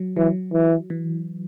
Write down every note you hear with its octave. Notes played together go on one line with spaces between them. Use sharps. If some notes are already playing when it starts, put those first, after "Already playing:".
Already playing: F#3
E3 F#3
E3
E3